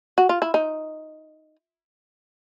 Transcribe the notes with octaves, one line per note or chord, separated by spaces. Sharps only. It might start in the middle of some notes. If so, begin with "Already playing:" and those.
F#4
F4
E4
D#4